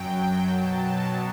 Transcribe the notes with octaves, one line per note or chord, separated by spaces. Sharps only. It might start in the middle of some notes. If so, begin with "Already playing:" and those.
Already playing: F#2 F#3 G5
B2 F#3 A5